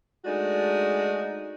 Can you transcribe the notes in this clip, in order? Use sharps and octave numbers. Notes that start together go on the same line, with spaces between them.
G#3 A3 D4 D#4 F#4